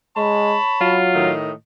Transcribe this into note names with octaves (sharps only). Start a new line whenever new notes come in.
G#3 C#5 A5 B5
F#3 F4
A2 D#3 D#5